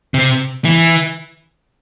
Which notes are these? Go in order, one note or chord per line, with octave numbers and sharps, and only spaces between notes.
C3
E3